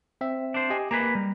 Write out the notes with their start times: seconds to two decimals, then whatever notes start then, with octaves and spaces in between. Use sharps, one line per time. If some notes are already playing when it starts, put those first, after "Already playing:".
0.21 C4 E5
0.54 D4 C5
0.70 G4 D#5 G#5
0.91 A#3 G#4 B4 A#5
1.15 G3